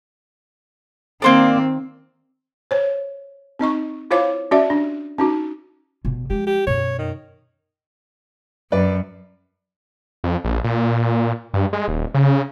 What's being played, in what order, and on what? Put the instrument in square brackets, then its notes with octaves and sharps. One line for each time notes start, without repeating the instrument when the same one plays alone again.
[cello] D#3 C4 [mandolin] A#3 C5 D5
[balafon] C5 C#5
C4 D#4 D#5 C#6
E4 F4 C5 C#5 F5 D6
C#4 F#4 D5 E5
D4
C#4 D#4 F#4
[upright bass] G1 B2
[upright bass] F3 G#3 [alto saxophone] G4
[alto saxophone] G4
[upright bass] F#2 B2 [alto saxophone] C#5
[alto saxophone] D#3
[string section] F#2 [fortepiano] B4 D5
[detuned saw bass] F2
A#1
A#2
G2
G#3
D#1
C#3